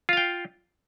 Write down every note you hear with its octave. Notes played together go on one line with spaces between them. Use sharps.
F4 F5 G5